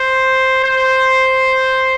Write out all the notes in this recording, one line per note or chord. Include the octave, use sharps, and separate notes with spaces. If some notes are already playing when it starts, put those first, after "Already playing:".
Already playing: C5
C5